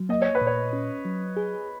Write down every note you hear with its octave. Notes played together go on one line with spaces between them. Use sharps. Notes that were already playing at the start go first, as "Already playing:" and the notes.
Already playing: F#3
A#3 D#5
C#5
B4
A#2
C#5
C#4
F#3
G#4